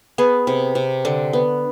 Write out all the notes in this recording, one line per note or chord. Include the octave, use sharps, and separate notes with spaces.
B3 G#4
C3
C3
D3 D4
B3